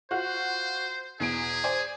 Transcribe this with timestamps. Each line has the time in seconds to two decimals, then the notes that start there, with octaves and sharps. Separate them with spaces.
0.11 F4 F#4 C5
1.20 E2 B2 G#4 D7
1.64 C5 D5 G#5